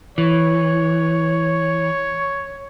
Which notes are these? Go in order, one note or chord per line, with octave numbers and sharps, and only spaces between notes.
E3 C#5